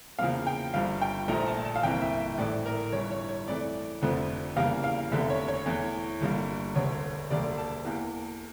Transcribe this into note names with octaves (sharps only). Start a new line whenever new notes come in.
E2 C#3 F3 A#3 F5
G5
G1 G2 F3 F5
G5
A#1 A#2 F3 A3 A#5
A5
A5
F5
G1 F2 E3 A#3 G5
E5
E5
A#1 A2 E3 A3 D5
A#4
G1 G2 E3 C#5
C#5
C#5
F2 E3 A3 D5
F1 F2 D3 F3 A3
E2 C#3 E3 G3 A#3 F5
F5
F1 E2 D3 A3 E5
C#5
C#5
E2 E3 A3
G1 G2 D3 G3 A#3
E1 D2 D3 C#5
E1 D2 D3 G3 A#3 D5
A5
E2 E3 A#3